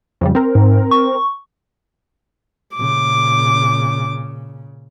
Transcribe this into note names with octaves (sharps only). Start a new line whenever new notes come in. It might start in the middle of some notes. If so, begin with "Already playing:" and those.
F2 C#3 G3
C4 A#4
G#2
C#6
A#2 C#3 D6